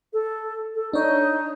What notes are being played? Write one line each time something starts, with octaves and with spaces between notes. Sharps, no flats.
A4
A4
D4 D#4 C#5